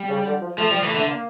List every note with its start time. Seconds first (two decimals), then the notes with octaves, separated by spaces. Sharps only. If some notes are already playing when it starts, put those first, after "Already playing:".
Already playing: G3
0.09 C#3
0.26 D3
0.41 F3
0.58 F3 A3
0.71 F3 G3
0.83 E3 A3
0.95 D3 A3
1.08 A#3